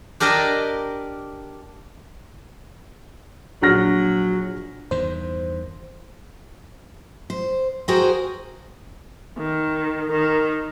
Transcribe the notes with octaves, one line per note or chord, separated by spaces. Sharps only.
D4 G4 A#4 D#5 G5 A5
A#1 F#3 F6 A#6
E2 G2 D#3 C5
C5
F#4 G#4 A#4 C5 G5
D#3
D#3 A#4